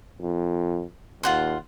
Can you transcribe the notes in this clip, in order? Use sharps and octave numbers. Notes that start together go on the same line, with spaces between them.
F2
D#2 F4 F#5 C6